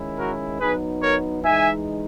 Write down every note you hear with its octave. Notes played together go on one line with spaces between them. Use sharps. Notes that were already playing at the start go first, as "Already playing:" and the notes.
Already playing: D#3 G#3 C#4 E4
F#4 A#4
F#3 B3 D#4 G#4 B4
A#4 C#5
E3 G#3 D#4 E5 G#5